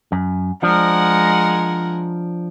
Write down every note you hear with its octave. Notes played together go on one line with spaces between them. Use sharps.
F#2
F3 G#3 D4 A#4 F#5